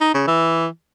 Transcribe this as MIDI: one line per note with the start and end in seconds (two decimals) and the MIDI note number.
0.01 0.13 63
0.14 0.23 49
0.27 0.67 52